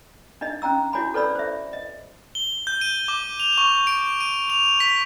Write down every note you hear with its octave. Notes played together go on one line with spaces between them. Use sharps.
D4 D#4 D#5
C#4 G5 A#5 E6
E4 F#4 C#5 G#5 B5
A4 B4 C#5 D5 B5 E6
C5 E5
D#5
G7
G6
D#7
D6
F7
C#6
D7
D#7
F7
B6